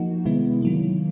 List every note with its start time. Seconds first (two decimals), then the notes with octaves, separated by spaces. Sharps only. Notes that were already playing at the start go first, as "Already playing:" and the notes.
Already playing: F3 A#3 D#4 F#4
0.25 C3 D#3 G#3 B3 E4
0.62 D#3 F#3 A#3